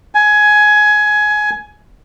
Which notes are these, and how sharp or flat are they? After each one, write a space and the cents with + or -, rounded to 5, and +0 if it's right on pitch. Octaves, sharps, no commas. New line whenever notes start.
G#5 +15